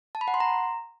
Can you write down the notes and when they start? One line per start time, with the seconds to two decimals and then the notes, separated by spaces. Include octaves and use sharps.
0.15 A5
0.21 B5
0.28 F#5
0.34 C6
0.40 A#5